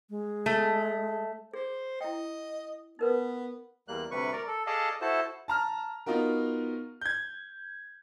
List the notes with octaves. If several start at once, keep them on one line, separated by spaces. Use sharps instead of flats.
G#3
A3
G#4 C5
E4 D#5 G5
B3 D#4 A#4 B4
E2 G3 A#3 F#6
D2 C3 G3 B4 C#6
A#4 D5
A4
G#4 A4 D5 D#5 F5 A5
E4 F#4 A4 C5 A5
A5 A#5 F6
B3 D#4 F4 F#4 A#4
G6 G#6